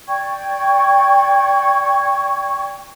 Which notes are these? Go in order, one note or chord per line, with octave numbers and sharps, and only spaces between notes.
D5 G5 C#6 G#6